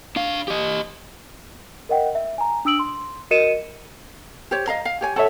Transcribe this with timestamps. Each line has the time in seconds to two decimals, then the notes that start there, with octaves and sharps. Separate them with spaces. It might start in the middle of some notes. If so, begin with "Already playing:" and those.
0.16 D4 F5
0.48 G4 D#5
1.89 A#4 D#5 F#5 G5
2.15 E5
2.38 G#5 A#5
2.65 D4 D#6 E6 D7 F#7
2.79 C6
3.31 F#4 A#4 D#5 C#7 D#7 E7
4.51 G4 C5 C#5
4.67 D#5 F5 A#5
4.85 F5
5.01 G4 C#5 G#5
5.16 A4 C#5 E5 F#5